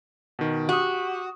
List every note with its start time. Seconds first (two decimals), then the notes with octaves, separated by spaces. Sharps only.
0.39 B2 D#3
0.69 F#4 G4 D#6